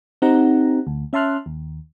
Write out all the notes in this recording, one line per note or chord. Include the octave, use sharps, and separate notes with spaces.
C4 D#4 G4 F#5 A#5
D2
C#4 E5 A5 C6 F6 F#6
D#2